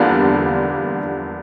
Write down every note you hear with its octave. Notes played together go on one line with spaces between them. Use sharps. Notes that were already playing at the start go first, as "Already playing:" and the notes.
Already playing: E2 D3 G3 A#3 D4 F4